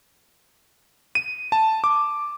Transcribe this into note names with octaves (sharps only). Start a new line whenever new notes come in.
D#7
A5
D6